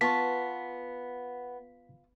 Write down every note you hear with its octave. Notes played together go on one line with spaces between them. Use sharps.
B3 F4 A5 C#6 B6